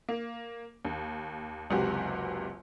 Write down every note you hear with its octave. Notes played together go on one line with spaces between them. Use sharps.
A#3
D#2
F#1 C#2 C3 F#4 G4 G#5